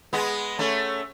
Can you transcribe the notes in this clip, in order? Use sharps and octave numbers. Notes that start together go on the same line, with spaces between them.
G#3 B3
A3 C#4